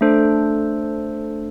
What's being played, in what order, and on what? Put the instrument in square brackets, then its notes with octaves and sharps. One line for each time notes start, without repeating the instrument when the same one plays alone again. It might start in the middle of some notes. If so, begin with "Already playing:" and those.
[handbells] A3 D4 A4 C5